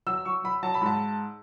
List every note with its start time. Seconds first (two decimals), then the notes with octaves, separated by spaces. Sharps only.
0.07 F#3 E6
0.25 F#3 C#6
0.44 F#3 B5
0.63 F#3 A5
0.74 B5
0.81 G#2 A5